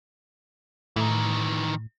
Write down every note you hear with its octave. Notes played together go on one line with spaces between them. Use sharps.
A2 D#3 E3